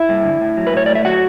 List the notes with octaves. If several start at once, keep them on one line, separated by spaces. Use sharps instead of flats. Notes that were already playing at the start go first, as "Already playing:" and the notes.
Already playing: E4 E5
G2
D3
A2
F#3
B4
A2 C#5
A3 D5
E5
F#3 F#4 F#5